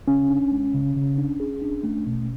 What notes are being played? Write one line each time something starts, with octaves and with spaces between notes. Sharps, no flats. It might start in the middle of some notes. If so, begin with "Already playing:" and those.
C#3 C#4
D4
G#3
C#3
C#3
D4
G#4
D4
A3
B2